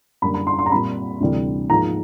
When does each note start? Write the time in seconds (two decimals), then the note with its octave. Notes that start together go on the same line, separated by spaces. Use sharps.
0.22 F#2 D3 G3 A#3 B5
0.34 B5
0.47 C6
0.59 C6
0.66 A#5
0.71 A#2 G3 C4 B5
1.20 D2 C3 E3 G3
1.70 G#2 F3 A#3 A#5